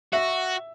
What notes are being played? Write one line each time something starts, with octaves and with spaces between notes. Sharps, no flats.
F#4 E5